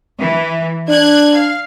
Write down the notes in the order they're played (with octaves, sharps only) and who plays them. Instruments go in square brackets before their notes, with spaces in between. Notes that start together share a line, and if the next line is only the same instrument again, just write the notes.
[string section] E3
[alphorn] D4 [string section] F#6 G#6
[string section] F5